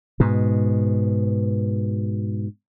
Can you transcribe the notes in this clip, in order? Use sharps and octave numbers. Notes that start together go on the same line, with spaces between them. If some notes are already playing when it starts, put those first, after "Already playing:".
G#2 B2